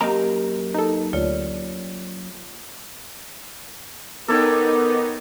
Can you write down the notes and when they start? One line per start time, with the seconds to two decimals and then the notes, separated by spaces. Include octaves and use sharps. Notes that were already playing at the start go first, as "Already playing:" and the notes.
0.01 F#2 A#3 G4 D#5 A#5
0.74 D#4 A4
1.13 D2 F4 C#5 D5
4.28 B3 D#4 A4 A#4 C#5 G5 D6